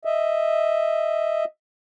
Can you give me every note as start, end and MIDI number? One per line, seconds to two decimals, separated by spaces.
0.05 1.45 75
0.05 1.45 76